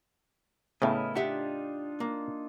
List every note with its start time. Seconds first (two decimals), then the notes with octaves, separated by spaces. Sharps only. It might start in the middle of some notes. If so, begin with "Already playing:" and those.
0.82 A2 C#3 B3 E4 A#4 D#5
1.15 D4 D#4 F4 G4 E5 F#5
2.00 A#3